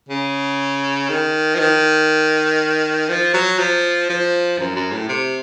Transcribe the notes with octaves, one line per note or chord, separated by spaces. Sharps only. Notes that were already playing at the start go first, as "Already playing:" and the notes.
C#3
D#3
F3
D#3
F3
F#3
F3
F3
F#2
F#2
A2
C3